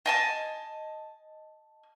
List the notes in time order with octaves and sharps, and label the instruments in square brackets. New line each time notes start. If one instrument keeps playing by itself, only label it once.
[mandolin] D#5 G#5 A5